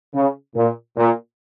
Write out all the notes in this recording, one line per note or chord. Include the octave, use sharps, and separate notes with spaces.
C#3
A#2
A#2